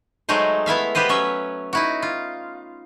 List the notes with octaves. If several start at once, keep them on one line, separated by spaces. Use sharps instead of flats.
F#3 G#3 A3 D#4 C5
B3 E4 E5 F5
B3 G4 B4 C5 D#5
F#3 C#4 E5
D#4 E4 F#4
F4